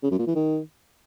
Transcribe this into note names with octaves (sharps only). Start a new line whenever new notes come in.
C#3
F#2
A#2
E3
D#3